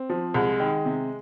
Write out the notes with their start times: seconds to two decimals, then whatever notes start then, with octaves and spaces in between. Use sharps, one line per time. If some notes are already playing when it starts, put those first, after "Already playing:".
Already playing: C4
0.10 F3
0.34 C2 G#3
0.60 D#3
0.85 C3